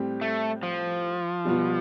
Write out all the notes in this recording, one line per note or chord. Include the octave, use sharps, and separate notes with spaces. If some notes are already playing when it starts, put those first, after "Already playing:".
Already playing: A2 G3 C4 G4
A3
F3
B2 G3 B3 F4